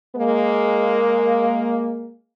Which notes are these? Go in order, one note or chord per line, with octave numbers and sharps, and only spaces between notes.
G#3 A#3